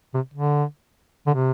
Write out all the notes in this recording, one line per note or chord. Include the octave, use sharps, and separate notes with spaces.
C3
D3
D3
C3